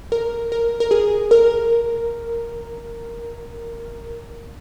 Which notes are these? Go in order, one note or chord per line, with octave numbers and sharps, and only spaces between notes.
A#4
A#4
A#4
G#4
A#4